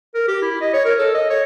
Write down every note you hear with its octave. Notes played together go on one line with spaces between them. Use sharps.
A#4
G4
E4
D#5
C#5
A#4
A4
D#5
C#5